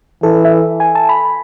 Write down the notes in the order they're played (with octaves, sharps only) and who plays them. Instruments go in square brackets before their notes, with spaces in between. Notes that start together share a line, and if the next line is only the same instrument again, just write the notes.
[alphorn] E3 [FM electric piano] A4
[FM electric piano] E5
G#5
A5
B5